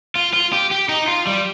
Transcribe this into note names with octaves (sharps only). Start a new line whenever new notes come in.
F4
F4
G4
G4
D#4
F4
G3